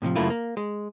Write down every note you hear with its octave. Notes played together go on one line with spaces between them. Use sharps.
A2 C3 E3 F3
F#2 C#3 A3 A#3 E4 F4
A#3
G#3